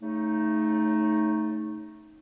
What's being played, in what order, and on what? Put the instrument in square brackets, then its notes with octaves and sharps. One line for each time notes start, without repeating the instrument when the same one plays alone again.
[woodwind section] C#3 A3 D#4